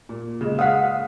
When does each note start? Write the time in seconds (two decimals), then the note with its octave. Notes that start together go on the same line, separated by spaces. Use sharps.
0.09 A#2
0.41 C#3 G#3
0.59 F5 F#5 D#6 B6